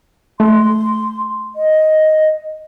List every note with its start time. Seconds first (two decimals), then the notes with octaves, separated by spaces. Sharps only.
0.40 A3 C6
1.56 D#5